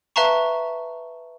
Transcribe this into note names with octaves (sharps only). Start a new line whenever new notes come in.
B4 E5 F5 A5 A#5 C#6